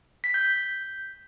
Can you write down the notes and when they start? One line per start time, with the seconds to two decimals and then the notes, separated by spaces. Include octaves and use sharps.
0.24 B6
0.34 G6
0.45 G6